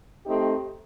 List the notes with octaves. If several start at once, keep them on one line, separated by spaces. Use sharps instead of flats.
A3 C4 D#4 G4